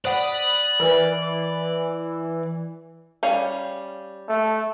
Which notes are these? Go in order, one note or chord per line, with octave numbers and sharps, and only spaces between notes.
C5 D5 F#5 B5 D#6 F#6
E3 A#4 B4
G3 C#4 F5
A3